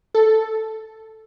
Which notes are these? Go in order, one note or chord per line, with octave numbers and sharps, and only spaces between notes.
A4